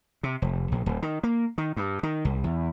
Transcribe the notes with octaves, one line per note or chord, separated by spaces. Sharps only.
C3
F1
A#1
D1
D#3
A#3
D#3
G2
D#3
C2
E2